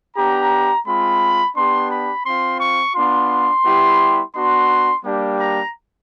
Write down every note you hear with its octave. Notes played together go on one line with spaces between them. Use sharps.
B3 D4 G4 A#5
G#3 C4 F4 B5
B3 D4 G4 C6
B5
C4 F4 C6
C#6
B3 D4 F4 C6
G3 B3 E4 G4
B3 D4 F#4 C6
G3 A#3 D4 G4
A#5